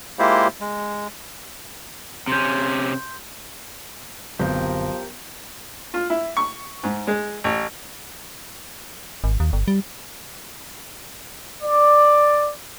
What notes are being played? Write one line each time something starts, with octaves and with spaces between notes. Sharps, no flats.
G#3 A#3 E4 F4 G4 C5
G#3
C3 C#4 C6 G6
F#1 B1 D3 F3 C4 G4 A#4 G5
F4
E4
C#6
G#2
G#3
A1
G#1
D#2
G1
G3
D5